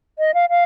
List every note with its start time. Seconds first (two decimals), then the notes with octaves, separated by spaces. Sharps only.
0.19 D#5
0.34 F5
0.49 F5